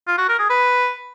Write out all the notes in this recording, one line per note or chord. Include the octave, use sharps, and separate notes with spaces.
F4
F#4
A#4
G#4
B4